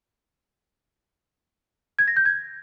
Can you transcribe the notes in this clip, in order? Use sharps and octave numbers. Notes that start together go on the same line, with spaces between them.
G#6
A#6
G6
G#6